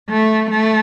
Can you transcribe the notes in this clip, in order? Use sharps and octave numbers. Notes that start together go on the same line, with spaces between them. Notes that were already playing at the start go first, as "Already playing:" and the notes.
A3
A3